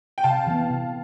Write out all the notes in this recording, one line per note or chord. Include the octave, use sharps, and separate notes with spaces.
G5
C3 F5 A5
E3 B3
C3